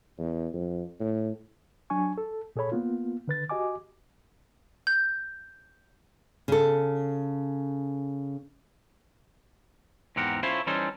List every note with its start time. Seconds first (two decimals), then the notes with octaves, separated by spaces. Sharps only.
0.18 E2
0.53 F2
1.00 A2
1.90 F#3 D4 G#5 C#6
2.18 A4
2.56 A#2 G#4 A4 C#5 B5
2.72 A#3 B3 F4
3.28 D3 B4 A6
3.50 F#4 G4 D#5 G#5 D6
4.87 G6
6.48 C#3 A4
10.16 E2 G#2 C4 G4 A#4 F#5
10.43 C#4 E4 F4 A4 C5 C#5
10.67 E3 G3 C#4 D#4 A4 C5